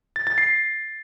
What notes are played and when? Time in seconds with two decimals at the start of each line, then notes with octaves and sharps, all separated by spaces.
0.16 A6
0.27 A6
0.38 C7